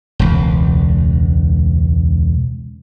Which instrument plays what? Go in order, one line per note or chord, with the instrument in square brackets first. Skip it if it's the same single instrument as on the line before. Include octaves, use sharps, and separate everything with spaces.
[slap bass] E1 C#2